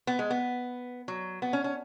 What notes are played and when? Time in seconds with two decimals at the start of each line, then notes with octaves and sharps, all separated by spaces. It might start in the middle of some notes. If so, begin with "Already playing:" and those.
0.07 B3
0.19 G#3
0.30 B3
1.08 F#3
1.42 B3
1.53 C#4
1.64 C#4